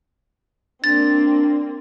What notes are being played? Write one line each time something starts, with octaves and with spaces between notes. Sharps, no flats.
A#3 C4 D4 A6